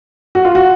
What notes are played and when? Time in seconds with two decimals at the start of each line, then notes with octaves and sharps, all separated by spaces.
0.35 F#4
0.45 F4
0.55 F#4